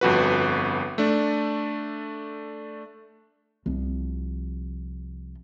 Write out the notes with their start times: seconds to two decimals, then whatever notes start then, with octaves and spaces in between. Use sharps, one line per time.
0.01 G1 F2 F#4 B4
0.98 A3 D4
3.66 C2 F3